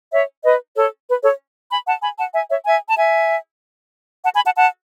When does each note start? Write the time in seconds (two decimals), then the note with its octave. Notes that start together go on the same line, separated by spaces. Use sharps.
0.12 C#5 E5
0.44 B4 D#5
0.76 A4 C#5
1.08 B4
1.23 A4 C#5
1.71 G#5 B5
1.86 F#5 A5
2.02 G#5 B5
2.18 F#5 A5
2.33 E5 G#5
2.50 C#5 E5
2.66 E5 G#5
2.87 A5
2.97 E5 G#5
4.24 F#5 A5
4.34 G#5 B5
4.45 F#5 A5
4.55 F#5 A5